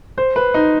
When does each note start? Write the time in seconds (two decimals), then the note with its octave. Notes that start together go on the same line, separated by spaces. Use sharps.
0.18 C5
0.36 B4
0.54 D#4